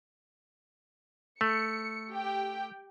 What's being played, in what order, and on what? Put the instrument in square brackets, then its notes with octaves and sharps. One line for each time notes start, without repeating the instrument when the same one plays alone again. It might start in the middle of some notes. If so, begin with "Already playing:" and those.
[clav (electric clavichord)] A3 [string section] C#7
[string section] G4 G5